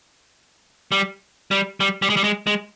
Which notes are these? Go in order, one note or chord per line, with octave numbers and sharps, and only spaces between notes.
G3
G3
G3
G3
G#3
G3
G#3
G#3